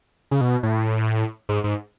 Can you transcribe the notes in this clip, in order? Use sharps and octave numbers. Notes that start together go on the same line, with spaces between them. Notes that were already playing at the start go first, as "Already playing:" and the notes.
C#3
B2
A2
G#2
G#2